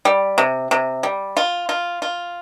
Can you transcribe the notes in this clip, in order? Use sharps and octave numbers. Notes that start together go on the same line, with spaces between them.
G3
C3
C3
G3
F4
F4
F4